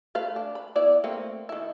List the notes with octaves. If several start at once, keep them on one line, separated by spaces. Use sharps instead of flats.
A3 B4 F5
D4
B5
B3 E4 D5
A3 A#3 C4
D#3 E4